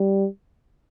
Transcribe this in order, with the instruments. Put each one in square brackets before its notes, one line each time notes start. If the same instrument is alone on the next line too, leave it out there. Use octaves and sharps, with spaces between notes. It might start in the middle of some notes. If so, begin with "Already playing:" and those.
Already playing: [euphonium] G3